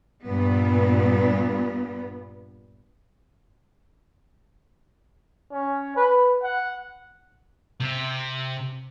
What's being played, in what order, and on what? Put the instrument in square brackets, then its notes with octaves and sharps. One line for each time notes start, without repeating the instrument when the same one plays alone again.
[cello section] G2 A#2 B3
[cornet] C#4
B4
F#5
[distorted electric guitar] C3